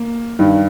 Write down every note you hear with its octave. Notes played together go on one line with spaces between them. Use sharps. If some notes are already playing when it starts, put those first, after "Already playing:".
Already playing: A#3
G2 D#3